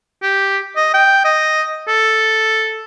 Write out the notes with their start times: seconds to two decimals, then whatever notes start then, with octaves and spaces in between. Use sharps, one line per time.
0.23 G4
0.76 D#5
0.94 G5
1.25 D#5
1.88 A4